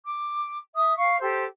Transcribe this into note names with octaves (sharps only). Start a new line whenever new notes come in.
D6
E5 D#6
F5 C#6
G4 A4 C5